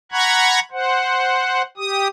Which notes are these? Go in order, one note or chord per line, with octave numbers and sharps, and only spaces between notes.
F#5 A#5 B5 C#6 F#6 G#6
C5 F#5
G4 D#6